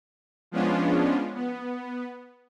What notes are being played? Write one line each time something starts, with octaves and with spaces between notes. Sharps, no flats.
F3 G#3 B3 C#4 D4 F4
B3